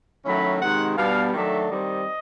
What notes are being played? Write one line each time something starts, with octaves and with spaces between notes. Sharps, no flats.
D#3 F#3 A3 C#4 E4 B5
C3 D#3 G#3 F#5
B2 G3 B3 D4 F5
D#3 F#3 A3 D4 E5
D#3 G3 C4 D#5